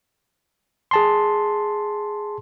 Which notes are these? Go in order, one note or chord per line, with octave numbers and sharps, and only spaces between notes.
G#4 A5 C6